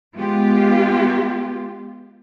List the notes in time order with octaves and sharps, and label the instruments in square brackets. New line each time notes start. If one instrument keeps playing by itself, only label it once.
[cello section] G#3 B3 F4 G4